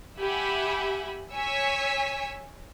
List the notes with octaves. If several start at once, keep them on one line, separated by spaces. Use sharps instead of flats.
G4 E5 F#5 G#5 B5
C#5 G#5 E6 B6 C#7